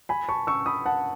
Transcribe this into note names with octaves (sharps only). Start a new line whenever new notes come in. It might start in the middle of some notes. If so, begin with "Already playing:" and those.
G#5 B5
A5 C#6
C#6 E6
B5 D#6
F#5 A5